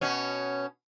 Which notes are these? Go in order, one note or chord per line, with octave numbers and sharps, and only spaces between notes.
B2 C#4